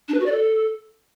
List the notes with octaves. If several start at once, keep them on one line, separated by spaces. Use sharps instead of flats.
D4
B4
F#4
D5
A4